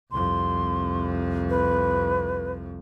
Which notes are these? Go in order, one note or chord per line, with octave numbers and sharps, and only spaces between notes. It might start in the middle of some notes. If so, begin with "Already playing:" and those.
C2 F2 C6
B4